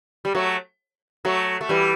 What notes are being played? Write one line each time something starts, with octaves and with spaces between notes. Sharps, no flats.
G3
F#3 A3
F#3 A3
A3
E3 G3